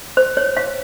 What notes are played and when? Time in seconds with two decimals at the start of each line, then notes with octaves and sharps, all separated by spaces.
0.17 C5
0.37 C#5
0.57 F5